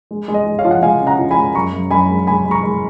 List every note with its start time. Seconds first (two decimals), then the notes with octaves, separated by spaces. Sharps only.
0.11 G#3
0.28 G#3
0.34 D#5
0.46 G#3
0.59 C#5 F5
0.65 F3
0.71 F#5
0.83 G#3 F5 G#5
1.01 C#3
1.07 F#5 A#5
1.19 F3
1.31 G#5 B5
1.37 G#3
1.55 F#2 A#5 C#6
1.73 F#2
1.91 F#2 G#5 B5
2.09 G#3
2.27 G#3 G#5 B5
2.45 G#3
2.51 A#5 C#6
2.63 G#3